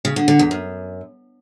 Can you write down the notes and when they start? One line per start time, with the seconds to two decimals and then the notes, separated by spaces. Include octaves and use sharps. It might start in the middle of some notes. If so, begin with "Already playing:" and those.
0.05 C#3
0.16 D3
0.28 D3
0.39 E2
0.51 F#2